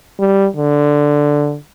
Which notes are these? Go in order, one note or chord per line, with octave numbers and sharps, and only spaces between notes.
G3
D3